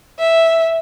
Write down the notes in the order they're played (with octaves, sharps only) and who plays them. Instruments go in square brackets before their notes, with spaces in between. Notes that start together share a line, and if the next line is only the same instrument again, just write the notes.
[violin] E5